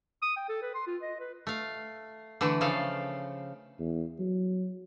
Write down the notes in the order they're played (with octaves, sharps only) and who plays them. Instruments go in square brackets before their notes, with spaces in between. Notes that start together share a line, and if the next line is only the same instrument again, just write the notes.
[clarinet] D#6
G5
A4
B4
C6
F4
D#5
B4
[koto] A3 F5
D3 E3 A3
C#3 F3 A4 F5
[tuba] E2
F#3